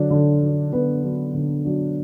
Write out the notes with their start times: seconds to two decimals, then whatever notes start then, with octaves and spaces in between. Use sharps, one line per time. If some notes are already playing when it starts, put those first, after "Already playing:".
Already playing: D3 F#3 D4
0.11 D3
0.42 F#3 D4
0.72 D3 B3 B4
1.03 F#3 D4
1.34 D3
1.65 F#3 D4